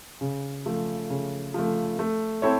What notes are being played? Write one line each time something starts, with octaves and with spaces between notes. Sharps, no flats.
C#3
F3 A3
C#3
F3 A3
A3
C4 E4 A4 C#5